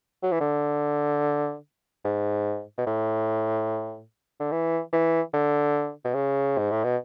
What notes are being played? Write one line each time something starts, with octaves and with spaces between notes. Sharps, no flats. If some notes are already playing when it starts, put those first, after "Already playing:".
F#3
E3
D3
G#2
B2
A2
D3
E3
E3
D3
B2
C#3
G#2
A2
B2